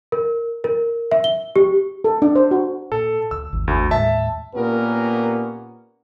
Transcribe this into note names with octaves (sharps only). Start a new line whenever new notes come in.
A#4
A#4
E5
G7
G4
A4
D4
C5
F#4
A#2 A4
D2 E6
G#1 E2
D2
D#2 A2 G#3 E5 A5
A#2 A#3 B3 C#4 G4 A#4